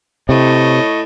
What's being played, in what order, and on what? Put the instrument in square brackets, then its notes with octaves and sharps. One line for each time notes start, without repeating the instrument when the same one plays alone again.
[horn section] A2 C#5 D#5 [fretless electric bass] C3